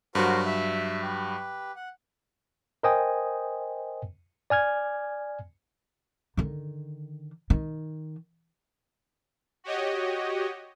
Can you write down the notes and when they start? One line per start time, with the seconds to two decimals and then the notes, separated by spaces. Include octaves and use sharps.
0.15 G2 F#3 F#4 A#4 C5
0.46 E5
1.02 G4 B4
1.76 F#5
2.83 A#4 C5 D#5 G5 G#5 D#6
4.50 D5 G#5 F6 G#6
6.37 D3 D#3
7.50 D#3
9.64 F#4 G4 C#5 D#5